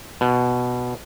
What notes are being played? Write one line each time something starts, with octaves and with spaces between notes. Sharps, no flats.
B2